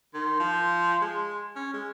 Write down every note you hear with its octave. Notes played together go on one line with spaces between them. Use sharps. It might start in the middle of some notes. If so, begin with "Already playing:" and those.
D#3 C6
F3
G#3
C#4
G#3